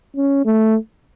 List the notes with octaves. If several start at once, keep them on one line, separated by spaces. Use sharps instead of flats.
C#4
A3